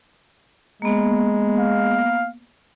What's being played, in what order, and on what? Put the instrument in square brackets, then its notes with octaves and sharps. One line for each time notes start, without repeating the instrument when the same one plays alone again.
[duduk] G#3 [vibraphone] A#3 B3
[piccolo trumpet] F5